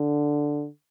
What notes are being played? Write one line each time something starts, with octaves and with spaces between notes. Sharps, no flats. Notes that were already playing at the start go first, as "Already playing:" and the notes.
Already playing: D3